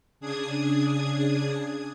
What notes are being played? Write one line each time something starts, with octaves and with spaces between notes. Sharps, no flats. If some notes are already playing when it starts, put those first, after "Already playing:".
C#3 D4 G#4 D#6 G#6